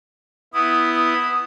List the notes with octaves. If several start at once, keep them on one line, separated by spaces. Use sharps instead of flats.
B3 E4 D#6